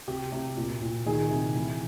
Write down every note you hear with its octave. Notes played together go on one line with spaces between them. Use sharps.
C3 G4
C3
A#2
A#2
D#3 G#4
C3
E3